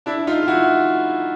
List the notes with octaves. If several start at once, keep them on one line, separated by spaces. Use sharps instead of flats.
D4 E4
D#4 F4
F4
E4 F#4